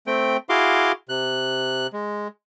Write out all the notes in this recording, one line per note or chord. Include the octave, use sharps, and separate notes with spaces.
A3 C4 G5
E4 F#4 G#4 F5 C6 D6
C3 F#6
G#3